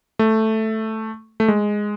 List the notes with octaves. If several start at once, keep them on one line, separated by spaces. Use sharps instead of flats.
A3
A3
G#3